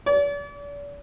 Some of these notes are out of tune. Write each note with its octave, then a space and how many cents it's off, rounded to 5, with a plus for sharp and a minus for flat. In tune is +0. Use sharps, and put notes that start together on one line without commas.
D5 -40